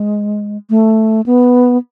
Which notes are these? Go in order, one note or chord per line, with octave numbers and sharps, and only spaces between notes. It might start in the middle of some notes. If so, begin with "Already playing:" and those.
Already playing: G#3
A3
B3